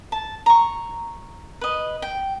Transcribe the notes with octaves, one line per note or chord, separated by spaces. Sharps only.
A5
A#5 C#6
B4 D#5
G5